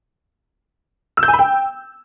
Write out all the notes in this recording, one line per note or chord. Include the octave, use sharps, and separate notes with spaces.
E6
G6
G#5
B5
G5